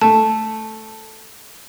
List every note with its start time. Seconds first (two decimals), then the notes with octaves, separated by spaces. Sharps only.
0.01 A3 A5